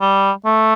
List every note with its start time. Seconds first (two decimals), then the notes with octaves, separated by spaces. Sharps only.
0.01 G3
0.45 A3